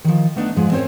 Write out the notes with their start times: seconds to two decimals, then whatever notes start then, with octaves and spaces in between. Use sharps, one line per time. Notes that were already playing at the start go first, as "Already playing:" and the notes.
0.04 D#3 F3
0.36 A3 B3 D4 D#4
0.56 G#2 F3 G#3
0.72 C4 C#4 A#4 C5 C#5